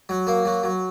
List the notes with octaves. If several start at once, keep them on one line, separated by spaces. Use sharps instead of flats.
F#3
A#3
F#3
F#3